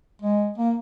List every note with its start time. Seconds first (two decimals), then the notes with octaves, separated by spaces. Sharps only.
0.22 G#3
0.58 A#3